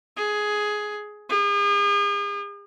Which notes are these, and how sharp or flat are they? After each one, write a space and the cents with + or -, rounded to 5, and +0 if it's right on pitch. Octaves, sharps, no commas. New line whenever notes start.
G#4 +10
G#4 -40